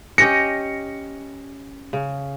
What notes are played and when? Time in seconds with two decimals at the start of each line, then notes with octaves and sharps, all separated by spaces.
0.18 C#4 G4 D#5 A#6 C#7
1.93 C#3